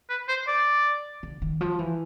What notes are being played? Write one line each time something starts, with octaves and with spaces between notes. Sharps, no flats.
B4
C5
D5
D3
D#3
F3
E3